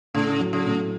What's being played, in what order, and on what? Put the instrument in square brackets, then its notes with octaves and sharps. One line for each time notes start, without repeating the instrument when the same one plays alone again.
[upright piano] A2 [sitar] C#3
[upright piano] F#3
[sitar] C#3
[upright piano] A2